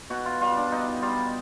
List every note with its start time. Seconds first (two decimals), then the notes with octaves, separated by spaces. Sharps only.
0.10 B2 F#4
0.25 F4
0.41 G3 F4
0.56 D4
0.71 B2 D#4
1.02 G3 F4